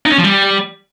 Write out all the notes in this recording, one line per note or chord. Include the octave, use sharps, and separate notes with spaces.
D#4
C#4
F3
G3